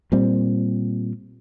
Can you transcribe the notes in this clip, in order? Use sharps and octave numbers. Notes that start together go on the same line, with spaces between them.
A#2 G3 C4